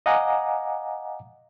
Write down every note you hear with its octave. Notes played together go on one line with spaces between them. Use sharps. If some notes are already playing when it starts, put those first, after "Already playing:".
D#5 F5 F#5 G#5 A#5 D6